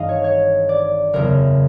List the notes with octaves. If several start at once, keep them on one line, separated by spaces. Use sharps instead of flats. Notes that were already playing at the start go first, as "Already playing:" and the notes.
Already playing: G#1 G2 E3 G3 D#5 F5
C#5
C#5
D5
F#1 E2 C#3 A#4